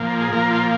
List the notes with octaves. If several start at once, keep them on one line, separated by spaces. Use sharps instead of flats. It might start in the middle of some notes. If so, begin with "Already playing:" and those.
Already playing: A#2 F3 A#3
G#4
A#2 F3 A#3 A#4
F4